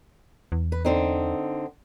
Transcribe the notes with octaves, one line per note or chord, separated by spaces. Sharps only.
E2
B4
D3 C4 D#4